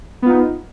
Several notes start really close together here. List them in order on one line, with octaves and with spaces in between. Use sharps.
B3 F4 D#4